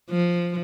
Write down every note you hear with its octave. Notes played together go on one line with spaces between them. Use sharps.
F3